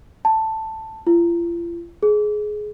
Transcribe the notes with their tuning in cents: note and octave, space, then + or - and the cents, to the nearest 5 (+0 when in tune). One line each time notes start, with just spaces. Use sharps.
A5 +5
F4 -40
G#4 +20